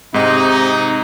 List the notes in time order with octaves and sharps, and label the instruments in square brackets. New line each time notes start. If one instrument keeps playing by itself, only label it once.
[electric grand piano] G#2 [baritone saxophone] C3 [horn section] D#4